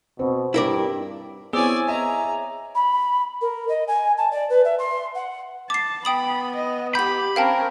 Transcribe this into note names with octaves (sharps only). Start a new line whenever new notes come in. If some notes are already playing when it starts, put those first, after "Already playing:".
B2 C4
G2 E4 A#4 D5
B3 C4 E4 G#4 C#5 D5 G#5 E6
D#5 E5 G#5 A#5
B5
A#4
D#5
G#5
A5
D5
B4
E5
C6
F#5
A5 D6 C7
B3 G5 B5 D#6 F#7
D#5
G4 B5 G6 F#7
C4 C#4 A#4 F5 G5 A5